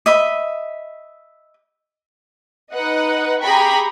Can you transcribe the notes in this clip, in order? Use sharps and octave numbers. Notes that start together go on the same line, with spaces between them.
D#5 E5 B5
D#4 B4 D#5 F#5
G4 G#4 G5 A#5 B5 C#6